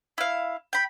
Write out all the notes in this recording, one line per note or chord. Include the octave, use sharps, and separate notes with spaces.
E4 F5
G5 B5